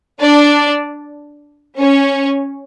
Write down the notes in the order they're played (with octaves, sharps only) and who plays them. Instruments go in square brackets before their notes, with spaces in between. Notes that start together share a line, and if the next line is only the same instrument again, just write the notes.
[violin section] D4 D5
C#4 C#5